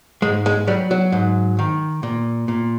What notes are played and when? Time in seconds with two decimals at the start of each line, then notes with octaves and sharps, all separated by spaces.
0.22 G#2 G#3
0.46 G#3
0.67 F#3 G3
0.91 F#3
1.12 G#2
1.59 D#3
2.03 A#2
2.48 A#2